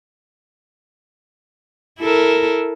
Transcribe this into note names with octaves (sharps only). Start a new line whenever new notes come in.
E4 A4 A#4